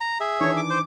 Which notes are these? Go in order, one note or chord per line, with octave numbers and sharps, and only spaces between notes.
A#5
G#4 E5
D#3 E3 D4 C#5
D6
C5